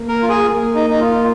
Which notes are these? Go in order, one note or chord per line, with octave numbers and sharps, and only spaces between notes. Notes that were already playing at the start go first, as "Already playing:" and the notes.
Already playing: A#3
A#4
F4
G#4
A#3
D#4
D#4
F4